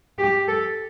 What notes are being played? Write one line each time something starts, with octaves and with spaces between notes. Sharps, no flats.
G4
A4